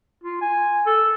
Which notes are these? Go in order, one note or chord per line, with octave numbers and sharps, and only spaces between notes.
F4
G#5
A4